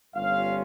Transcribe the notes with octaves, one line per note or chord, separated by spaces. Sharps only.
G1 G2 G3 C#4 F4 F5